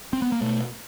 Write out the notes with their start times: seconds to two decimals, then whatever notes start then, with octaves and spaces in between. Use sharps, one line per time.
0.13 C4
0.22 B3
0.32 A#3
0.41 B2 A3